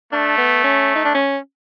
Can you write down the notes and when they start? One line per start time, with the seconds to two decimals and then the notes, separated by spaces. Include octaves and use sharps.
0.12 A3 D4
0.38 B3
0.64 C#4
0.96 D#4
1.05 D4
1.15 C#4